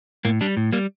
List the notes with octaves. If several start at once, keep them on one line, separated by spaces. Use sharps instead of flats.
A2 A#3
G3 D4
A2
G3 A#3